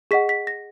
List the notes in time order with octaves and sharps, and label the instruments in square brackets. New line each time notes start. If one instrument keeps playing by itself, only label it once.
[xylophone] G#4 D#5 F#5 B6
B6
A#6